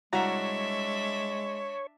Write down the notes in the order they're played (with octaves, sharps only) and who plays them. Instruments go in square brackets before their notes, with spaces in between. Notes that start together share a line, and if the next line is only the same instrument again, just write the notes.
[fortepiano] C2 F#4 A#5 [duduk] G#3 [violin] D4 E5 [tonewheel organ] C#5